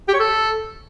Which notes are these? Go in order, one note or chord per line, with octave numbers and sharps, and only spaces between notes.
G4
C#5
A4